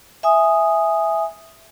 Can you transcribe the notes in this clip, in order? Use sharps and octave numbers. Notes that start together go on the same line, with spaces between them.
E5 G#5 D#6